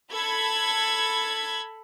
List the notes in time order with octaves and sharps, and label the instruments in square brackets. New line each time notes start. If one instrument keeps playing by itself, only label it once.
[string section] A4 B5 G#6